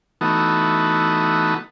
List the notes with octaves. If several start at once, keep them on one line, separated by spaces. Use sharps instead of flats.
E3 A3 B3 D#4 F#4